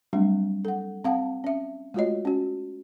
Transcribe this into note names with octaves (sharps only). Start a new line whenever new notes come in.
F#3 G3 A3 C4 D4
A4 F#5
C4 F5 F#5 A5
C#4 E5
G#3 A3 F4 F#4 C#5 D#5
C#4 F#4